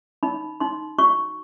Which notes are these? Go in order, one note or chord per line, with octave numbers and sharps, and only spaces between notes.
D#4 B5
D#4 C6
F#4 C#6